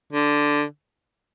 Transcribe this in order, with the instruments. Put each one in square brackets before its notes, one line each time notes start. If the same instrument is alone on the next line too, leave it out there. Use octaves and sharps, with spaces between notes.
[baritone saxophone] D3